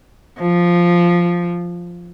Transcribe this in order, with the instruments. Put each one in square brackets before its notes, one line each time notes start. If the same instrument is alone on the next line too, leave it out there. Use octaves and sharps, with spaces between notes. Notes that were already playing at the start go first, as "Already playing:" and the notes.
[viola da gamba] F3